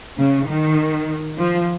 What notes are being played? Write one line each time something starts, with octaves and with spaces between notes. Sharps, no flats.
C#3
D#3
F3